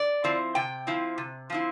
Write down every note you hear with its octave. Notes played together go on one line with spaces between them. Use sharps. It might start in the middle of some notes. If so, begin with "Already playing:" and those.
Already playing: D5
F3 C4 E4
C3 G5
F3 C4 E4
C3
F3 C4 E4